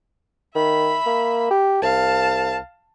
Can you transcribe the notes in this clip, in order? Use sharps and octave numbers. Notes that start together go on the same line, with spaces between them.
D#3 E5 B5
A#3
G4
C2 F5 A5